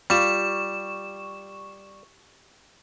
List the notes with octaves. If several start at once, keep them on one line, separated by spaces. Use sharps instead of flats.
G3 F4 G4 C#6 E7